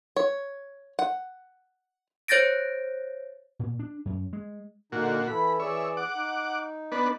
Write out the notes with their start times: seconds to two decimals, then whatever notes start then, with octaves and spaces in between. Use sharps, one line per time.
0.16 C#5
0.99 F#5
2.28 C5 C#5 G6 A6 A#6 D7
3.59 A#2
3.79 D4
4.05 F#2
4.33 G#3
4.92 A#2 D3 D#4 F#4
5.28 E3 E4 A4 B5
5.60 E3 G#4 C#5 D5 E5
5.97 F#5 D6
6.15 D#4
6.92 B3 D4 B4